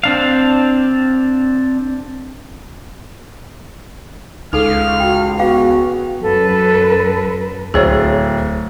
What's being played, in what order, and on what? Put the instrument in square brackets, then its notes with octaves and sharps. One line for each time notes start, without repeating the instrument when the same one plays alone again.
[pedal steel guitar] C4 D4 F5
[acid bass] C#2 [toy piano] D#4 G#4 A4 [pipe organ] F5 F6
[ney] F#4 [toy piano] G5
[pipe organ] B3 [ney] F#4 [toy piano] G#4 F5 G5
[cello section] F#2 B4 [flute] A4
[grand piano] D1 [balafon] G#4 C5 C#5